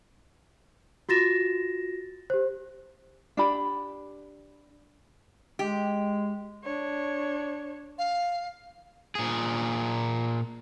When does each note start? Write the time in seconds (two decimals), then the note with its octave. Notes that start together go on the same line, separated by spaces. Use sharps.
1.09 F4 F#4 A6 A#6 E7
2.30 G4 C5
3.37 D4 G4 B5
5.59 G#3 G4
6.63 D4 C#5
7.98 F5
9.15 A#2 G#4